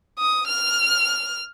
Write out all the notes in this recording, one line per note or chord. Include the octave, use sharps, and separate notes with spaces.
D#6
F6